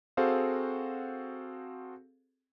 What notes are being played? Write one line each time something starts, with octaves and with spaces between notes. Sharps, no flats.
C4 F#4 G#4 A4 C5 F5